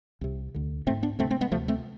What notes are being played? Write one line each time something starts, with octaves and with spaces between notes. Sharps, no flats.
C2 C3
D2 D3
G#1 A3 C4
G#2
B3 D4
D2 C3 A3 C4
A3 C4
G#3 B3
D2 C3 F3 A3
A3 C4